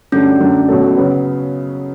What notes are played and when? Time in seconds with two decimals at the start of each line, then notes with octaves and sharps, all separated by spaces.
0.12 G2 D3 F#3 A3 C#4 D4
0.40 F#2 D3 A3 D4
0.68 B2 F#3 A3
0.97 C#3 F#3 B3